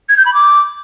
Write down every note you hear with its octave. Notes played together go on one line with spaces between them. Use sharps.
G#6
G6
B5
D6